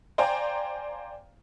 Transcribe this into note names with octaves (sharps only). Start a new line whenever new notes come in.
C5 D5 F5 G5 G#5 A#5